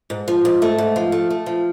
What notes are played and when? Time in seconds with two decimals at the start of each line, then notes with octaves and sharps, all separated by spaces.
0.10 G#2
0.28 F3
0.45 G#2
0.62 A3
0.78 G#2
0.96 F3
1.12 A3
1.30 A3
1.46 F3